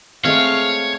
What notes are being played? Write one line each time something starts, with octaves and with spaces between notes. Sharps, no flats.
G#3 A3 C4 C#5 F5